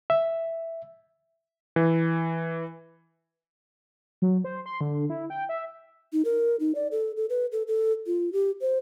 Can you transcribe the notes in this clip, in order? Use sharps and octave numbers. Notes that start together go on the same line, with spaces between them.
E5
E3
F#3
C5
C6
D3
E4
G5
E5
D#4
A#4
D#4
D5
A4
A4
B4
A4
A4
F4
G4
C5